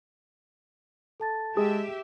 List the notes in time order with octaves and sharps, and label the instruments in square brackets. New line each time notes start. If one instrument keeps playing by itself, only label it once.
[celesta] A4 A5 A6
[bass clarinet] G#3 [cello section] G4 E5 [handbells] G#4